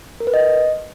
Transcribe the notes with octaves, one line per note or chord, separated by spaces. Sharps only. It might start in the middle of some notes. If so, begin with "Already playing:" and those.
A#4
B4
D#5